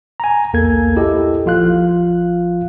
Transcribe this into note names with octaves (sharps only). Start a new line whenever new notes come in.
G#5 A#5
B1 E2 A#3 A4 A#4 G#6
E4 G4 A4 D#5
A1 F3 F4 F5 F#6